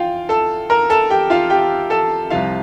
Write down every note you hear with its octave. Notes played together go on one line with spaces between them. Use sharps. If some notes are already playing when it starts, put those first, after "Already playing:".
Already playing: E2 F4 F5 G5
A4 A5
A#4 A#5
A4 A5
G4 G5
F4 F5
G4 G5
A4 A5
C2 C3 F3 F4 F5